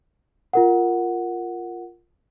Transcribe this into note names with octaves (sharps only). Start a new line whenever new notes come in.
F4 A#4 F#5